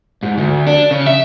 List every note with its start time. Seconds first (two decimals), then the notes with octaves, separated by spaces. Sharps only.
0.23 G#2
0.37 D2
0.67 D4
0.91 C#3
1.07 E5